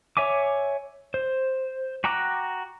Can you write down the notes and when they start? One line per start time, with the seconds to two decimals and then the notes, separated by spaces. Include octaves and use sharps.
0.17 C#5 E5 G#5 D6
1.14 C5
2.04 F#4 G5 A#5 D6 F#6